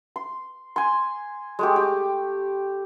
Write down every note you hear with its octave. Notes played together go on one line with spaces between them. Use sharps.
C6
G#5 C6
G#3 A3 G4
G4